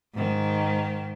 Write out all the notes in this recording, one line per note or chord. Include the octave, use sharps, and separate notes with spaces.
G#2 D#3